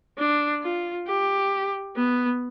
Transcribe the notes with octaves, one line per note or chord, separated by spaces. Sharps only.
D4
F4
G4
B3